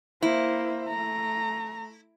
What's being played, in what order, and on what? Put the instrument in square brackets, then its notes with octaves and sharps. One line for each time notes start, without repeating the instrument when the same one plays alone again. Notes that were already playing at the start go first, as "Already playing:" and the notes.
[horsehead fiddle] A#3 C5 [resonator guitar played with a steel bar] E4
[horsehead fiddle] A3 A#5